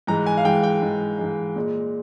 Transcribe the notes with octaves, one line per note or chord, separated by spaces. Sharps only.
G#2 E3 G#3 A#5
G#5
F5
G#2 E3 G#3 G5
G5
G#2 E3 G#3
G#2 E3 G#3
A#2 G#3